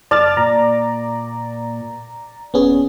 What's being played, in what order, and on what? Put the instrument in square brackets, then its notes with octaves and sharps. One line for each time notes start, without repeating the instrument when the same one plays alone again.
[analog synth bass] F#1 [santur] D5 [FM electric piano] A5 F6 A6
[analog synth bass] A#2 [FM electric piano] A#5
[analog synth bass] D#1 [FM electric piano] B3 C#4 G#4